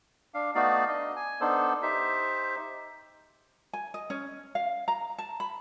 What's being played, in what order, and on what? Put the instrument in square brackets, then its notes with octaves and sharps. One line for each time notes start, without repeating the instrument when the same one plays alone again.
[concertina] D4 F5
A3 B3 D#4 F#4 D5 F5
D4 D#5
G#5
B3 D4 D#4 A4 C5
D#4 G4 C5 E5
[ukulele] G#5
D#5
C#4
F5
A#5
A5
B5